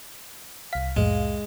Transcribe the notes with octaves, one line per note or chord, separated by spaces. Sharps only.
C2 F5 B6
F2 A2 G#3